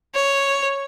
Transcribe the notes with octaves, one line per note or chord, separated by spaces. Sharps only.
C#5